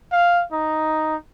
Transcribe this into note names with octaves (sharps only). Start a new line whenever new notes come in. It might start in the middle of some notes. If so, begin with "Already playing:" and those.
F5
D#4